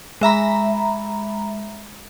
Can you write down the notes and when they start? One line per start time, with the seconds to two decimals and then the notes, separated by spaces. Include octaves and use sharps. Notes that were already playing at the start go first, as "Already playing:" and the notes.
0.21 G#3 E5 A#5 B5